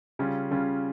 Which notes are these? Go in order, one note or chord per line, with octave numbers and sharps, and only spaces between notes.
C#3 G3 C#4 F4
C#3 G3 C#4 F4